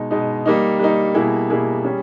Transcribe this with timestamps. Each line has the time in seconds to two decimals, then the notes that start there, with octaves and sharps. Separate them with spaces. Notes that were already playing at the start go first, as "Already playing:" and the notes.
Already playing: B2 G#3 D#4
0.11 B2 G#3 D#4
0.46 G3 A#3 D#4
0.79 G3 A#3 D#4
1.14 B2 G3 A#3 E4 G#4
1.50 B2 G3 A#3 E4 G#4
1.84 G3 C#4 G#4